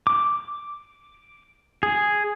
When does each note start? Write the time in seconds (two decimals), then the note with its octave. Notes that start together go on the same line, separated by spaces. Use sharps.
0.07 D6
1.83 G#4